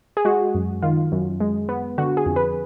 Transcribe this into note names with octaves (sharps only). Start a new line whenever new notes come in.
G#4
G#3 F#4
F#2
D#3 F4
F#2
G#3
B3
D3 F#4
G#4
F2
B4